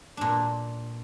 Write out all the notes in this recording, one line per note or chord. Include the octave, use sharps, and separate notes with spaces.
A#2 D4